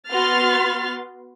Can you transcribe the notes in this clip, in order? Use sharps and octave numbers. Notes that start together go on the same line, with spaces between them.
B3 F#4 C6 F6 A6